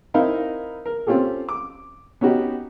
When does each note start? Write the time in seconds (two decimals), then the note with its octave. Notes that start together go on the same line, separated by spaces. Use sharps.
0.14 C4 D#4 E4 A#4 D#5 F5
0.86 A#4
1.07 C4 C#4 F4 G4 A4
1.49 D6
2.21 B3 C#4 D#4 F#4 G4